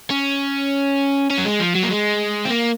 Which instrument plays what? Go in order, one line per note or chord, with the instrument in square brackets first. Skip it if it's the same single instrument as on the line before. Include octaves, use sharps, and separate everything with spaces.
[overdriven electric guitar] C#4
C#4
F#3
G#3
F3
F#3
A#3
G#3
C4
A#3